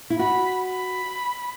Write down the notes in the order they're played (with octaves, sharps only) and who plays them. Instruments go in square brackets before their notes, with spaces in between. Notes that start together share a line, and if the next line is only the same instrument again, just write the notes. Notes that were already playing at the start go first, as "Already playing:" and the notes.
[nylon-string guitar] E4
[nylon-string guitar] F#4 [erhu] B5
[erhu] B5